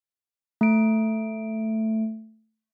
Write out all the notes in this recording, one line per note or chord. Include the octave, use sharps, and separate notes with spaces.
A3 D7